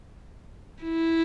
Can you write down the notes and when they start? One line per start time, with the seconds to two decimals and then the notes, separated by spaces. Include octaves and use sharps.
0.83 E4